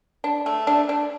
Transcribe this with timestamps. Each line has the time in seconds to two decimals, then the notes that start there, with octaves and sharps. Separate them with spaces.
0.24 D4
0.46 A3
0.67 D4
0.89 D4